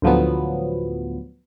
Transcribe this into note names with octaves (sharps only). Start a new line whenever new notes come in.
D2 A2 F3 F#3 B3